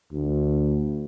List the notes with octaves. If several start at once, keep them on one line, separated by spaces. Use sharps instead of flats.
D2